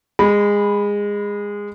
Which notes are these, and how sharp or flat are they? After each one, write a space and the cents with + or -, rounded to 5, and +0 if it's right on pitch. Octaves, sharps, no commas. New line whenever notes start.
G#3 -20 B5 +0